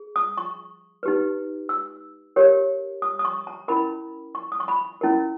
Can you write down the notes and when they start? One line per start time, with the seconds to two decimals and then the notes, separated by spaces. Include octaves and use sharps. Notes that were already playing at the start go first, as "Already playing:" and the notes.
Already playing: G#4
0.16 D#6
0.37 C#6
1.03 D#4 G4 B4
1.69 E6
2.36 G4 A#4 C#5
3.02 D#6
3.19 D#6
3.25 C#6
3.47 A#5
3.68 C#4 E4 A#4 B5
4.35 C#6
4.52 D#6
4.60 C#6
4.68 B5
5.01 C#4 E4 A#4